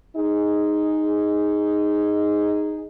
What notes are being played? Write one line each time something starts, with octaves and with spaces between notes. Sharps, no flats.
D#4 G#4